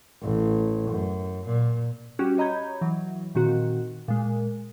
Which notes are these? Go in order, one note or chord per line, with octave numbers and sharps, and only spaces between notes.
A1
F#2
A#2
G3 C#4 F#4 G4
C#5 D#5 A#5 B5 G6 G#6
E3 F#3
A#2 D#3 C4 F#4
A#2 G#3